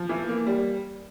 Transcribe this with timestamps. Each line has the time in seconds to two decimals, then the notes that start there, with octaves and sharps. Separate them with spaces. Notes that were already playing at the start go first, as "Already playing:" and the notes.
Already playing: F3
0.09 E3
0.28 A#3
0.46 G3